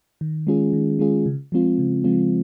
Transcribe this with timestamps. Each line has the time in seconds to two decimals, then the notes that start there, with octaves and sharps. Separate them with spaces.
0.21 D#3
0.47 G#3 C#4 F4 G#4
0.73 D#3
0.99 G#3 C#4 F4 G#4
1.26 C#3
1.52 F3 G#3 C4 F4
1.79 C#3
2.04 F3 G#3 C4 F4